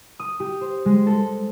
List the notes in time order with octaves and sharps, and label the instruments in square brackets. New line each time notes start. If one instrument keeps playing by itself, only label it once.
[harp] D#6
G4
C5
G#3
A4